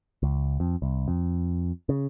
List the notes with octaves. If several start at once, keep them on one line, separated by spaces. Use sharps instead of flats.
C#2
F2
C2
F2
C#3